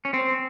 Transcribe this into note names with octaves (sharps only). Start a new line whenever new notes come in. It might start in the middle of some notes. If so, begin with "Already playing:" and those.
C#4
C4